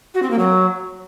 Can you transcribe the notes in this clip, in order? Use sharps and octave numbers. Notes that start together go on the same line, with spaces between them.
F#4
C4
A#3
F#3